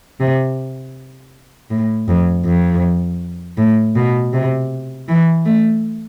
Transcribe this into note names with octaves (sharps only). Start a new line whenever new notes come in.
C3
A2
F2
F2
A2
B2
C3
E3
A3